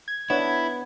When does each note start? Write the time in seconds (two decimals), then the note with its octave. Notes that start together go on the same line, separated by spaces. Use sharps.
0.08 G#6
0.30 B3 D4 E4 C#5 F#5